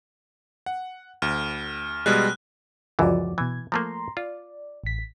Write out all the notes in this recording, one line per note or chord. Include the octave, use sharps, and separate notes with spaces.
F#5
D2 F6
B2 G3 G#3 F#6
C#2 F#2 E3 F3 F#4 D5
B2 E3 G#6
F3 A3 A#3 A#5 C6
F4 D5
A1 B6